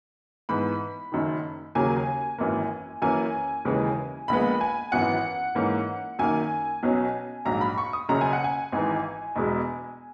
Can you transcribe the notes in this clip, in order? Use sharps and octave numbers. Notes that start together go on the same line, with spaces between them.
G#2 E3 B3 B5
F#1 F#2 D#3
D#2 C#3 F#3 A#3 G#5
G#1 F#2 E3 A#3
F#2 E3 A#3 C#4 G#5
D#2 C#3 E3 G#3
A#1 A#2 G#3 B3 B5
G#5
G#1 F#2 E3 B3 F#5
G#2 E3 A#3 C#4
F#2 D#3 A#3 G#5
B1 B2 F#3 C#4
A#1 G#2 F#3 A#5
B5
C#6
D#6
F#1 F#2 C#3 A#5
G#5
F#5
G#5
G#1 G#2 E3
E1 E2 B2 G#3 B3